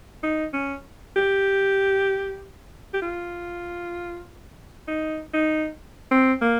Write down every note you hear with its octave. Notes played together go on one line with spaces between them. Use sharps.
D#4
C#4
G4
G4
F4
D#4
D#4
C4
A#3